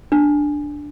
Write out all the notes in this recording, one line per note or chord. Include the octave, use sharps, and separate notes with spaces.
D4